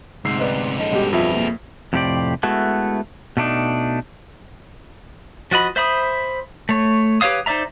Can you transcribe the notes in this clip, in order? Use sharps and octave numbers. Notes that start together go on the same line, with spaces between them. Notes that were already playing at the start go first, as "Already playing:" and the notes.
D2 G#2 C3 E6 C7
D#4 B4 D5
A#1 C#4 A4 D#5
G2 B2 G#3 G4
F2 F4 G#4 B4 E5
A#3
F2 A2 C3 G4 C5 D5
G#3 A3 B3 E4 F#4 A4
B2 A3 D4 D#4
F3 F#4 D#5 B5
C5 E5 B5 D#6
A3 C#5
G4 B4 C#5 F5 D#6
D#4 C5 D5 E5 A#5